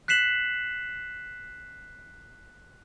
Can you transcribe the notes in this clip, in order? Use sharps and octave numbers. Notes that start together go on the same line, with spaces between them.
F#6 B6 C7 E7 F#7